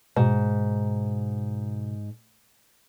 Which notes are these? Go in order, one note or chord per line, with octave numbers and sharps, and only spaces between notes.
G#2 B2